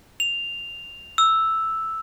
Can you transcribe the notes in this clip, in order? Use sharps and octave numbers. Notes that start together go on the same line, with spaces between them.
F7
E6